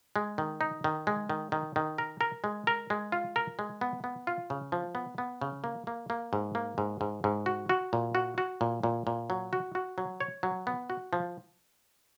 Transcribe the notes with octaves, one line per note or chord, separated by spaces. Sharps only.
G#3
D#3
D#4
D#3
G#3
D#3
D#3
D#3
A#4
A#4
G#3
A#4
G#3
F4
A#4
G#3
B3
B3
F4
C#3
F3
B3
B3
C#3
A#3
A#3
A#3
G#2
A#3
G#2
G#2
G#2
F#4
F#4
A#2
F#4
F#4
A#2
A#2
A#2
F#3
F#4
F#4
F#3
C#5
F#3
B3
F#4
F3